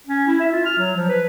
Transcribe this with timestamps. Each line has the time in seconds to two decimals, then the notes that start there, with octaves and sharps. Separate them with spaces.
0.07 C#4
0.27 E4
0.40 E5
0.52 F4
0.65 F6
0.78 F#3
0.97 F3
1.09 B4